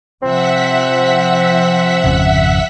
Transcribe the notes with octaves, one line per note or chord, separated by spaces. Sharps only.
C3 F3 C4 E5 F#5 B6
G#1 F2 C#3